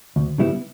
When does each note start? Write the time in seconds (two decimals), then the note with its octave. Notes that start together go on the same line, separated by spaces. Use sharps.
0.16 D2
0.38 C#3 G3 B3 E4